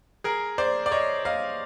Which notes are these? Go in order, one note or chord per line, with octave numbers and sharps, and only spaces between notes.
G#4 A#4
C5 D5
D5
C#5 D#5
D#5 F5